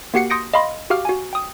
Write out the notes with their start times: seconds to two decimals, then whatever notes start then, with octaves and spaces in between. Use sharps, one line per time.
0.14 A#3 F#4 G4 F#5 C7 C#7
0.30 C6 D#6 G6 A#6 C#7 D7
0.54 D#5 F5 B5 C6 A#6
0.90 F#4 G4 F5 D6 F6
1.05 F#4 G#5
1.33 G5 D#6